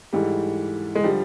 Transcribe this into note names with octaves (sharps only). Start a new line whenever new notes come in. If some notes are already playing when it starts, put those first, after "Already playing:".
G#2 E3 G3 A3
G#3
D3 F3 G3